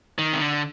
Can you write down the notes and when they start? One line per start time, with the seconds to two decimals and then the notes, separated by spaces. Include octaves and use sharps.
0.18 D#3
0.33 C3
0.40 D3